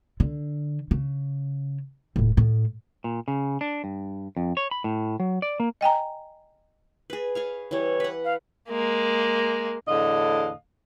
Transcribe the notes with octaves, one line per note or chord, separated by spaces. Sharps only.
D3
C#3
D#1 A2
A2
A#2
C#3
D4
G2
F2
C#5
B5
A2
F#3
D5
A#3
D#5 G5 G#5 A#5
G#4 B4
G#4 C#5 F5
E3 G3 C#5
B4 F#5
F5
G#3 A#3
E2 A2 D3 D#5 F5